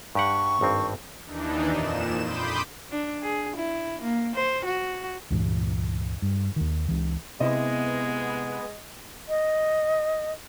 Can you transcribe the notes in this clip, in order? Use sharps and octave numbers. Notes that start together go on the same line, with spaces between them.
G2 G4 F#5 C#6
G#1 G2 C4
D#2 E3 D4 D#4
F2 A#2 E7
B5 C6 D6 D#6 G6
D4
G#4
E4
A#3
C5
F#4
C#2 G2 A#2 E3
G2
D#2 D#3
C#2 E3
C3 G#3 B3 E4 D#5
D#5